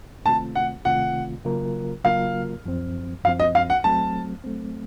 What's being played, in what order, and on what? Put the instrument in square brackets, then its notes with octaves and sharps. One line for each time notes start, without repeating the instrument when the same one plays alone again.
[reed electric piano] C3 D#3 A3 C4 F4 [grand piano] A5
[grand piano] F#5
[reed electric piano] C3 D#3 A3 C4 F4 [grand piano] F#5
[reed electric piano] C#3 F#3 A#3 F4 A#4
[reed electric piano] C#3 F#3 A#3 F4 A#4 [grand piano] F5
[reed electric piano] F#2 F3 C4
[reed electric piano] F#2 F3 C4 [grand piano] F5
[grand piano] D#5
F5
F#5
[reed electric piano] F#3 A3 C4 [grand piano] A5
[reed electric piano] F#3 A3 C4